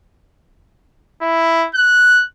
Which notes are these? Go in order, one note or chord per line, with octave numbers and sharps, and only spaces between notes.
E4
F#6